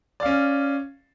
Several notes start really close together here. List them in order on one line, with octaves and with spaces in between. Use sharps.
D5 F5 C#4